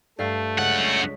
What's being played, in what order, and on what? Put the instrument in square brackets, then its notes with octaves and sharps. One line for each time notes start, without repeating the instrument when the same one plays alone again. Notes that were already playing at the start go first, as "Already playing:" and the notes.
[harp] G2 A4 F5 [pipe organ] A3
[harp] C#2 [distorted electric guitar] F#2 F#5